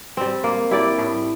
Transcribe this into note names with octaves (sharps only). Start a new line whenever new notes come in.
G3 C4
A#3
E4 G4 D5
A2